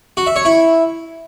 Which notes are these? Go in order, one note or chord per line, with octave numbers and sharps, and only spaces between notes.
F#4
E5
C#5
E4